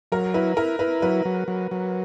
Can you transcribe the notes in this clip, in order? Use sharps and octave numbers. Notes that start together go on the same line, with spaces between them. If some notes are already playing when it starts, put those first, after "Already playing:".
F#3 A#4
E4 B4
E4 A#4
E4 B4
F#3 B4
F#3
F#3
F#3